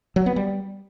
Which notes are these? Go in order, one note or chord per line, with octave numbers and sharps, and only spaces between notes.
F#3
B3
G3